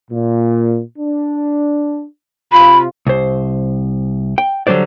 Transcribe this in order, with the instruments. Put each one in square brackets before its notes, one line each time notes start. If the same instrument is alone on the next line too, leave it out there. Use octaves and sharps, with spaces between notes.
[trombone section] A#2
D4
[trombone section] C3 F4 [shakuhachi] B5
[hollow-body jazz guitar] C2 C5
G5
D3 F#3 G3 C5 D5